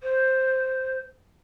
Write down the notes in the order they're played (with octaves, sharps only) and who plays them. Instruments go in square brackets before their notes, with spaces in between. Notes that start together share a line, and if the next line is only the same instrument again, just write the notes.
[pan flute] C5